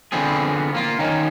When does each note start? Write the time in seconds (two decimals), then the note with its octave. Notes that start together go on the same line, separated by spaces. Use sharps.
0.12 D3 E3 F3 B3 C4 G#4
0.74 A#3 F4
0.99 D#3 C#4 D#4